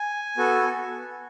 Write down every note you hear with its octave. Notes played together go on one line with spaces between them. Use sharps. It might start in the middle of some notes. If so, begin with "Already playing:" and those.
Already playing: G#5
B3 F#4 A4